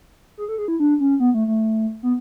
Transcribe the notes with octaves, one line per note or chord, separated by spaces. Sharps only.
G#4
A4
G#4
E4
D4
C#4
B3
A3
A3
B3